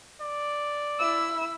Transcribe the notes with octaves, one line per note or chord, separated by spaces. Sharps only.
D5
E4 E6